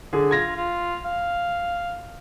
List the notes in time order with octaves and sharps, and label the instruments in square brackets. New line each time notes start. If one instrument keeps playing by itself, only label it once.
[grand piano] D3 G#4
[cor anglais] F4 [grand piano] G#6 A#6
[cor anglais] F4
F5